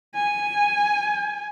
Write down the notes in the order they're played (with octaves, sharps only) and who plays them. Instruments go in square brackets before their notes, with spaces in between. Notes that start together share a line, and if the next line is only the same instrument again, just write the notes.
[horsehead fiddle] G#5